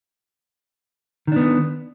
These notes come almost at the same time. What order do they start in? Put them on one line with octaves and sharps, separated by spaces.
D#3 D4 B3